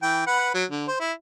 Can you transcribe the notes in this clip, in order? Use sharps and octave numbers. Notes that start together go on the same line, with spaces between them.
E3 G5
B4 F#5
F#3
D3
C5
E4